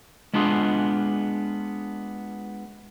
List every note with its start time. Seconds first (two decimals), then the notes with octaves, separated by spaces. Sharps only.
0.34 G#3 B3 D4 F4 G#4